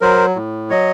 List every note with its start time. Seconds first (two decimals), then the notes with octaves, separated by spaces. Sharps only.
0.01 F#3 A#4 C5
0.36 A2
0.70 F#3 C#5 D#5